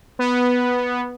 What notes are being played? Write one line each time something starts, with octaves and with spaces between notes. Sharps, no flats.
B3